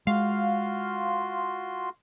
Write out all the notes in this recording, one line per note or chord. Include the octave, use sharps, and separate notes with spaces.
G#3 F4 F#4 F5 C6